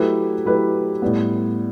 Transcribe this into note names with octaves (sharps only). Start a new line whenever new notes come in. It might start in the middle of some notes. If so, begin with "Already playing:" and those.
Already playing: F#3 A3 E4 G4 B4
F#3 A3 E4 G4 B4
A2 G3 B3